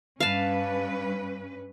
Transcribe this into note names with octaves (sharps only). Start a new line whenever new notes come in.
G2 C#4 B4 F5 A5